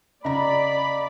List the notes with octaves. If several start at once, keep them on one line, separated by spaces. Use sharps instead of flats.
C#3 D5 D#5 A#5 B5